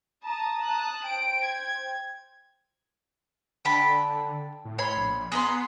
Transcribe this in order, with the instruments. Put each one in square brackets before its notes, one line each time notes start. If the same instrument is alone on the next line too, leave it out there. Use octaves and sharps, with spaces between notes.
[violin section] A5 D#6 [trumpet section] A#5
[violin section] A5 D#6 F#6
[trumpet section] C5 G5 [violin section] D7
[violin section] G#6
[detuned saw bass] D3 [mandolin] G5 A5 B5
[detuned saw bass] A2
[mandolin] C#5 B5 C6
[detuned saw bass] A#1
[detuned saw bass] B3 [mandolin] G#4 A#5 C6